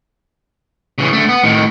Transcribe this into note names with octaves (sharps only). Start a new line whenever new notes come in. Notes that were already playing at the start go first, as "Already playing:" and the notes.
C#3 E3
D3 A3
B3
A2 D#3